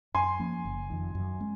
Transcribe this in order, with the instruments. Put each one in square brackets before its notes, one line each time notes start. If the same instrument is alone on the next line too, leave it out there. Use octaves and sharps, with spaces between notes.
[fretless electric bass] F#2 [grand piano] G#5 C6
[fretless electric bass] F3 A#3 C#4
F#1
F2 D#3
F#2
G#3 C#4